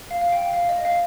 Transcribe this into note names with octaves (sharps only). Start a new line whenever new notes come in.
F5
F5
G5
F5
D#5
F5